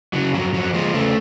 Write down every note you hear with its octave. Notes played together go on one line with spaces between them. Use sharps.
C#3 F#3
F2 F#3
F2 F#3
F3 G#3
C#3 A3